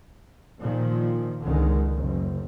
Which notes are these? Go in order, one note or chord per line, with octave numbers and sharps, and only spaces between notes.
A#2 D#3 F3
C#2 D3 D#3 G#3
F#1